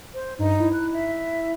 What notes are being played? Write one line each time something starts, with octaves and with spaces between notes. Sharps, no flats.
C5
G2 D#4
E4
F#6
E5